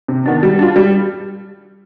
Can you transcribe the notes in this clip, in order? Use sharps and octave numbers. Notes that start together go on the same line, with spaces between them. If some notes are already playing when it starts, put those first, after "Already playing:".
C3
D#3 B3 D4
G3
D4 F4
G3